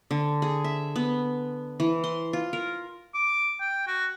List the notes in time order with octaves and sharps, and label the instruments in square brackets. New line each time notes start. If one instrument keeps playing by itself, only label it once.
[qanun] D3
G#4
E5
B3
E3
C6
F4
A#4
[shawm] D6
G5
F#4